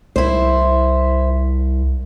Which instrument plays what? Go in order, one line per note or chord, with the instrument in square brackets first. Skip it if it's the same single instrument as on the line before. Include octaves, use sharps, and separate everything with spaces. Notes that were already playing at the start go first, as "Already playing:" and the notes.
[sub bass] C2 [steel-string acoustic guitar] E4 C5